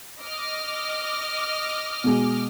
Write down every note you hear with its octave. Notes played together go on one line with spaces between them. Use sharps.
D#5 D6 F6
B2 G#3